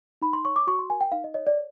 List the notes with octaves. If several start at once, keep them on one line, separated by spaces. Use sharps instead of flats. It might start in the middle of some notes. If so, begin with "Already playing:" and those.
D#4 B5
C6
C#5 C#6
D6
F#4 C#6
C6
A#4 G#5
G5
D#4 F5
D#5
C#5 D#5
D5